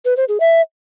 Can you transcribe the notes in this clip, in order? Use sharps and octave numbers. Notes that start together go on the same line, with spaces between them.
B4
C5
G#4
E5